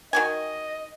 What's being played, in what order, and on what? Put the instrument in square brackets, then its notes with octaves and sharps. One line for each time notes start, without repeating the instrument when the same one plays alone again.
[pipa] D#3 F#4 G#5 [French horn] D#5